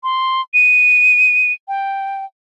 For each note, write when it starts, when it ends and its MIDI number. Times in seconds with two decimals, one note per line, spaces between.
0.03 0.41 84
0.54 1.52 99
1.68 2.25 79